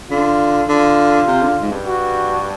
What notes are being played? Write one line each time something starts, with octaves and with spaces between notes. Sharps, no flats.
D3 F4
D3 F4
C3
D3
G#2
G2
F#4